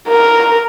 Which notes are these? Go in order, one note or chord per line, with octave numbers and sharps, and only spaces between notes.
A#4